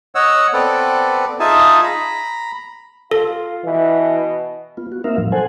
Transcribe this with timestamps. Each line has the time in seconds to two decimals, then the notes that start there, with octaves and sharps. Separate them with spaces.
0.15 C#5 D#5 F#5 E6
0.54 B3 C4 A4 B4 D5
1.40 D#4 F4 G#4 E5 G#5 A5
1.84 A#5 B5
3.11 F4 A4
3.65 B2 E3
4.77 B3 F4
4.92 F#4
5.04 A#3 C4 D#4 A#4 E5 F5
5.18 A2 F3 F#3
5.32 A4 C5 F#5 G#5